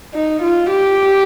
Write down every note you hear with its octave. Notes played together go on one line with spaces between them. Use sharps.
D#4
F4
G4